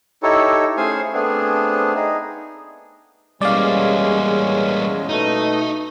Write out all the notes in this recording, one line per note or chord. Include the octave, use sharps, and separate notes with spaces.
D#4 E4 G4 A4 C#5
A3 C#4 G#4 C5 F5 G#5
A3 B3 C4 D4 G#4
D#4 G#4
E2 G3 G#3 A#3 C#4 D5 F5
B2 A3 D#4